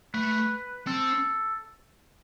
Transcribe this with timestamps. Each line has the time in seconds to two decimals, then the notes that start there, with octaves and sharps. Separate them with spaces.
0.14 A3 B4
0.87 C4 A4